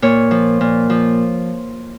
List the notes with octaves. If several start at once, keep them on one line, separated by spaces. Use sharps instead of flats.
A#2 C#5
F3
A#2
F3